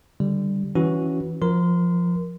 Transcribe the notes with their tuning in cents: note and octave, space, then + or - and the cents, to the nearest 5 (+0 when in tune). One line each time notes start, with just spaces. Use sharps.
D3 +0 G3 +0
E3 +0 C#4 +0 F#4 +0
F3 +0 A#4 +15 C6 -25